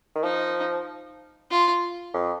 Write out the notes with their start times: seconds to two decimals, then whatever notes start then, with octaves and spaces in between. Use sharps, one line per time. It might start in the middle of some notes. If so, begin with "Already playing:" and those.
0.15 D#3
0.23 F3 D#4
1.50 F4
2.14 F2